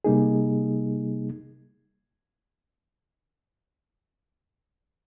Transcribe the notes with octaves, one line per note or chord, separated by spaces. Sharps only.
C3 G3 A#3 D#4 G#4